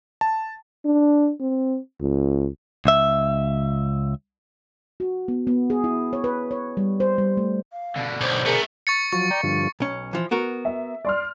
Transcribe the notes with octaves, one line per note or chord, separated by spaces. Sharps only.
A5
D4
C4
C#2
C#2 E5
F#4
B3
B3
G#4
E4
C#5
B4
C#5
G3
C5
G3
A3
F5
B2 D3
B1 C5
A3 B3 G#4 A#4
C#6 A6 C#7
F3 F#3 C#6
D5 G5 A#5
G2 D3 F3
B1 C#4
E3 F3
B3 F#4 A#4
E5
D5 C6 F6